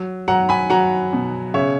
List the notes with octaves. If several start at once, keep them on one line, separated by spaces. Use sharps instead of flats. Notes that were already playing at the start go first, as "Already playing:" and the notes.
Already playing: F#3
F#3 F#5 A#5
G#5 B5
F#3 F#5 A#5
B2
C#3 C#5 E5